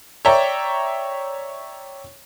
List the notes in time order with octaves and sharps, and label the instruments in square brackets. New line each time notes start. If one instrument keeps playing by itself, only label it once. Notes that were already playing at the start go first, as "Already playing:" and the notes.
[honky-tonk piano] C#5 D5 E5 G5 A#5 C#6